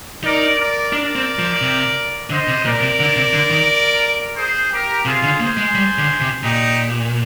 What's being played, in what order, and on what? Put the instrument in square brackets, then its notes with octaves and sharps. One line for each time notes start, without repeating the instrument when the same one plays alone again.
[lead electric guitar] D#4 [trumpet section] A#4 D5
[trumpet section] A#4 D5
[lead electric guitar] D4 [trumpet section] A#4 D5
[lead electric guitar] C4
F3
C3
[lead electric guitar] D3 [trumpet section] C5 D#5
[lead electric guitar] C3
[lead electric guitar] A#2 [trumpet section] A#4 D5
[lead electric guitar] C3
D3
C3
D3
D#3
[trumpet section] G#4 C5
G4 A#4
[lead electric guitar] C3 [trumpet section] F4 G#4
[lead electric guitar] D3
[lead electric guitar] A#3 [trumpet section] G#4 C5
[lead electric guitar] G#3
G3
D3
C3
[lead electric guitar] A#2 [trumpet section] D#4 G4